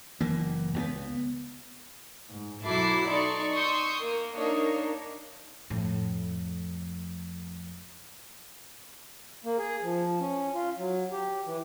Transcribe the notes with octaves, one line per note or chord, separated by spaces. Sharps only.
F#1 E3 A#3
C#2 F#3 B3
G#2
B1 F#3 E4 A4 D6 C7
D#4 A4 D5 C6 C#6
C6 C#6 D#6 E6 G6
A#3
A#3 D4 D#4 C#5
F2 A2
A#3
G#4
F3
C#4
F4
F#3
G4
E3